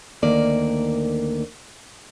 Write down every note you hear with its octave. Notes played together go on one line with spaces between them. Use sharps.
D2 D#3 A#3 D5